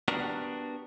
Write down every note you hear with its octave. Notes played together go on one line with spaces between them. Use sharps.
B3 D4 F#4 G4 A#4